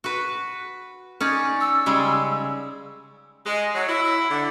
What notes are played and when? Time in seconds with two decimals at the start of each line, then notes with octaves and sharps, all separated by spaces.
0.04 F#4 B4
1.21 C#4 D#4 D5
1.61 E6
1.86 C#3 G3 G#3
3.46 G#3
3.75 F#3
3.88 E4
4.29 D3